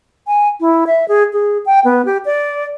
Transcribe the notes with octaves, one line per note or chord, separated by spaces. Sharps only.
G#5
E4
E5
G#4
G#4
G5
B3
G4
D5